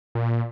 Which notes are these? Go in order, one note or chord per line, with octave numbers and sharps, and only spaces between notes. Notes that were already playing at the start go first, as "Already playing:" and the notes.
A#2